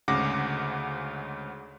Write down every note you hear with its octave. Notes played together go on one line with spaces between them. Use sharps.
D2 G#2 C#3 F#5 D6 A#6